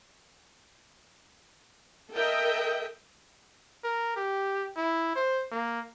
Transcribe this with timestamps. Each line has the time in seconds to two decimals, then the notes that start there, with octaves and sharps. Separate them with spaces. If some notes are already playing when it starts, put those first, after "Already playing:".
2.13 A4 A#4 D#5 E5 G5
3.84 A#4
4.16 G4
4.77 E4
5.16 C5
5.52 A#3